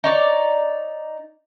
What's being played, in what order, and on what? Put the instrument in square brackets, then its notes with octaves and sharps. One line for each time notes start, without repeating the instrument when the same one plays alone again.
[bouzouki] D#4 C#5 D5